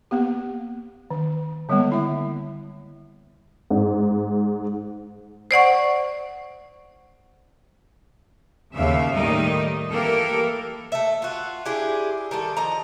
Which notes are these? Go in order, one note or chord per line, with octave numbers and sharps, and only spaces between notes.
A#3 B3 G4
D#3
D3 G3 G#3 A#3 B3
E4 E5
G#2
C5 D5 F#5 C#6
D#2 C#3 E5 F5
A2 D#3 G3 D#4 A#4 D#5
E3 A#3 G4 A4 A#4
A3 E5
F4 F#4
D4 E4 G4 G#4
D#3 G3 A4
D#3 F3 D#5 A#5